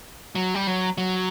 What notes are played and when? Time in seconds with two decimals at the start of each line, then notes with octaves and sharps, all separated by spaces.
0.35 F#3
0.54 G3
0.67 F#3
0.98 F#3